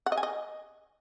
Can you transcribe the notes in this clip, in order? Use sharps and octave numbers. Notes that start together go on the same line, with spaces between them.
F#5
D#5
G#5
D#5